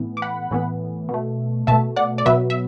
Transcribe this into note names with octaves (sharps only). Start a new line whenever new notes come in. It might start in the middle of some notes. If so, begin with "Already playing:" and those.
Already playing: A2 E3 B3
D6
F#5 B5
A2 E3 B3
B2
A3
B2 A3 E5 A5
D5 F#5
D5
B2 F#3 B3 B4 E5
E5